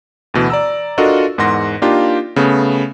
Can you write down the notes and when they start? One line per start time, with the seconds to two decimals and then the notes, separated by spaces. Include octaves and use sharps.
0.34 D2 B2 E3
0.50 D5 A#5 E6
0.98 D4 F4 F#4 A4 A#4 D#5
1.38 E2 G#2 A#4 F#5 C6 A#6
1.82 A#3 D4 D#4 F4 G4
2.36 C#3 A3 B3